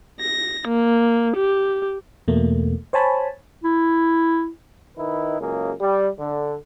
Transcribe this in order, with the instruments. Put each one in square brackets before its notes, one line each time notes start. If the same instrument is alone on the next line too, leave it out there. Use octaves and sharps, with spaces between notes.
[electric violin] A#6
A#3
G4
[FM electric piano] E2 B2 A3 A#3
C5 C#5 G#5 A5 B5
[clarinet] E4
[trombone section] D#3 D#4 E4 B4
C#2 F#2 A#3 G#4
G3
D3